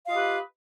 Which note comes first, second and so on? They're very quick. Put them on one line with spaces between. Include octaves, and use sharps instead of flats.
F5 F4 D#5 G4 B4